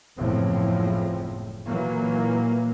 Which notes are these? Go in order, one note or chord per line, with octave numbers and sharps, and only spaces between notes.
F#1 E2 A2 F3 C4
A#2 E3 F#3 A#3